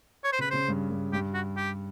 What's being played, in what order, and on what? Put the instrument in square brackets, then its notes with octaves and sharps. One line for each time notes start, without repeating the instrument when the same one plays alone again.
[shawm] C#5
C5
[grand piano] C#3 [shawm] B4
[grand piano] C#3 [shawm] C5
[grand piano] G2
G2
[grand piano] G2 [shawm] G4
[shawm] F#4
G4